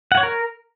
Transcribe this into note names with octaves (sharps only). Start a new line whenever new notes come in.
F#5
C#5
A#4